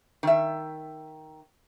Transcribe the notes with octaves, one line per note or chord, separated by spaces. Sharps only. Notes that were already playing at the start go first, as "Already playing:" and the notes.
D#3 E5